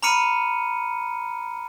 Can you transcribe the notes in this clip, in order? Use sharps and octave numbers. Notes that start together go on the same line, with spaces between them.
A#5 B5 D6 F6 C#7 D#7